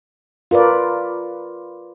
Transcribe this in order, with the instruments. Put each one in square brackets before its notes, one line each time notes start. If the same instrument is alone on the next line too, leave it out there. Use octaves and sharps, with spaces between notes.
[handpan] F4 A#4 B4 D5